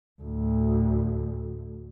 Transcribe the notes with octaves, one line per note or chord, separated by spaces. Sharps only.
D2 A2